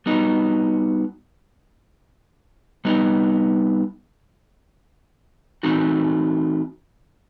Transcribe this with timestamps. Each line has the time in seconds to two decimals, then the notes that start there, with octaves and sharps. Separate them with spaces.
0.06 G3 B3 D#4 F#4
2.85 G3 B3 D#4
5.63 E3 A3 C4 D#4 F#4